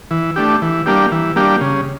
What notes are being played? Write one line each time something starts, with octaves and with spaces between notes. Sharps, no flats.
E3
A3 D4 G4
E3
G3 A#3 D4 G4
E3
G3 A#3 D4 G4
C#3